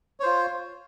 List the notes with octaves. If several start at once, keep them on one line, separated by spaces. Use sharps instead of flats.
F4 C5 C#5